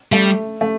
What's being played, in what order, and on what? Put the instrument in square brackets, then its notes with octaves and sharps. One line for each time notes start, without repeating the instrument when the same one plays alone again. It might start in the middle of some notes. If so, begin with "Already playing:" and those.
[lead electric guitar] G3 [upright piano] A3
[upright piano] A3